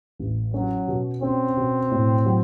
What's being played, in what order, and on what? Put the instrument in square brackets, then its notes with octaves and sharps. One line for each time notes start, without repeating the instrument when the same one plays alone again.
[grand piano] A1
[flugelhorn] F#3 [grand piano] C#4
[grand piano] B2
[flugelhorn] C4 [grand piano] C#4
[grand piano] B2
A2
F#3